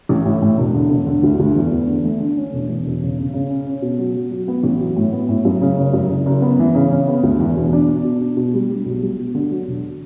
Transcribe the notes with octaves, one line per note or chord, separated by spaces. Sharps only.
A1
A2
A2
E1
D3
E1
D3
D2
D2
E2
E2
D3
A3
D3
C#4
E1
E2
E1
C#3
C#3
C#3
C#4
C#4
B2
F#3
F#3
F#3
B3
A1
F#3
A2
B3
A2
F#2
C#3
F#1
F#2
F#1
F#1
B3
E3
C#3
C#3
B3
D2
E2
B2
D4
D4
B2
D4
B2
G3
G3
B1
G3
B2
D3
F#3
E1